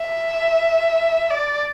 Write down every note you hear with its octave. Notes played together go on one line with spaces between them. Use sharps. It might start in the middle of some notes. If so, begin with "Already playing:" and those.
Already playing: E5
D5